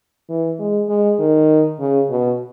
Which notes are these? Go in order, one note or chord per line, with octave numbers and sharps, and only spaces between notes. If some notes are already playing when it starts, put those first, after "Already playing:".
E3
G#3
G#3
D#3
C#3
B2